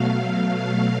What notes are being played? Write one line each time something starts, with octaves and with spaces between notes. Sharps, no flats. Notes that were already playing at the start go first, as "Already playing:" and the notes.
Already playing: B2 F#3 A3 F5
F5